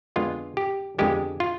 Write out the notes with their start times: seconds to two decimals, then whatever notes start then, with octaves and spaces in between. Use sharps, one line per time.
0.16 F2 D3 G#3 B3 F4
0.57 G4
0.98 F2 D3 G#3 B3 G4
1.40 F4